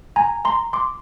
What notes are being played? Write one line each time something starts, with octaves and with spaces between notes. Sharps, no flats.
G#5 A#5
A#5 C6
C6 D6